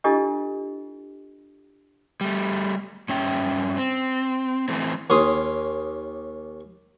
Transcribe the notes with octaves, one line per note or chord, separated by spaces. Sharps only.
D4 E4 F4 G4 A4 D#5
G3 A3
G2 C#4 E5 G5
C4
E3 A3 C4
D#2 C#4 C6 D#6